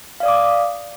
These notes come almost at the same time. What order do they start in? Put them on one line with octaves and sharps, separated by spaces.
F5 D5 D#6 D6